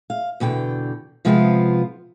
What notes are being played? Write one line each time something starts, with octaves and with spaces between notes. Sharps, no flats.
F5
E2 B2 D3 G5
C3 F3 G#3 B3 C4 F4